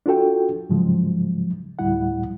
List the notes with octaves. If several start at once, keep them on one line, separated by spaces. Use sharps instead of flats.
D4 F4 F#4 A4 G5
G#2 C#3 F3 F#3 G#3
D2 A2 G3 E4 F#5